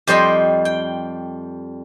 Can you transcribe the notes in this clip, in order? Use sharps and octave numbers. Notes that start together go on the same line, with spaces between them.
F2 G3 C5 D#5 G5
G5